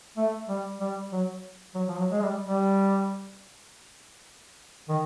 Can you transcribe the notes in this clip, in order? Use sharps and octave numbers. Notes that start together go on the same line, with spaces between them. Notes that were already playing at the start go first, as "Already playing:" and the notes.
A3
G3
G3
F#3
F#3
F3
F#3
G#3
G3
G3
D#3